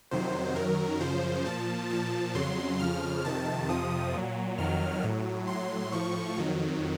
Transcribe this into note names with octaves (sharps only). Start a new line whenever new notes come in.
F2 C3 D#3 F#3 C5
F#2 D#3 F#3 A#4
F#2 C#3 F3 C5
A#2 F3 A5
A#2 F3 A5
F2 C#3 F#3 C6
F2 C#3 F3 F6
F2 C3 D#3 A5
F2 C3 F3 D#6
A#2 F#3
F2 D#3 F#3 F6
A2 F#3
A2 F#3 C6
A2 F3 C#6
F2 D#3 F#3